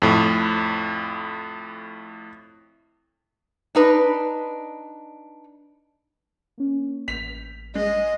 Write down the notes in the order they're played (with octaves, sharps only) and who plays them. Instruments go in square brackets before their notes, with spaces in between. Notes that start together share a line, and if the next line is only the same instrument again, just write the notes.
[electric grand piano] F2 A2
[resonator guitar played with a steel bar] D4 D#4 B4
[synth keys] A#3 C#4
[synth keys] A1 [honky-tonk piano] B6 F7
[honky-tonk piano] G#3 [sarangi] D#5